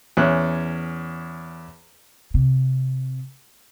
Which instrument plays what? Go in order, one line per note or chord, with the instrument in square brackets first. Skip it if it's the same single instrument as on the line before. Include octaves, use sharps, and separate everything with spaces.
[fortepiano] E2 C#4 F#6
[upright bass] C3